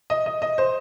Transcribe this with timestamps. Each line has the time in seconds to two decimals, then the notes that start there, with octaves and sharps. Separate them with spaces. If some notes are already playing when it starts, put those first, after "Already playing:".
0.10 D#5
0.26 D#5
0.42 D#5
0.58 C5